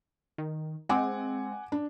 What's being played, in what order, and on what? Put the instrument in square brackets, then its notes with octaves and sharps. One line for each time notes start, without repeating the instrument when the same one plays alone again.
[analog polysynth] D#3
[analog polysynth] G#3 C4 [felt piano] F#5 G#5 D6
[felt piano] D4